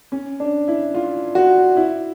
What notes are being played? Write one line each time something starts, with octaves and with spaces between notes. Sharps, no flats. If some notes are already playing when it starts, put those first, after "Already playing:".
C#4
D4
E4
F4
F#4
E4